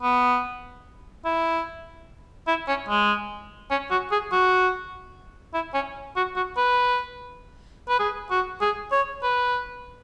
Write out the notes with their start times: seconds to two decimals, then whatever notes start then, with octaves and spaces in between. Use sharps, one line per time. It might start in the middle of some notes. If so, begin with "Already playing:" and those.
0.02 B3
1.25 E4
2.47 E4
2.68 C#4
2.88 G#3
3.70 C#4
3.91 F#4
4.11 G#4
4.32 F#4
5.54 E4
5.74 C#4
6.16 F#4
6.36 F#4
6.57 B4
7.89 B4
7.99 G#4
8.30 F#4
8.61 G#4
8.92 C#5
9.23 B4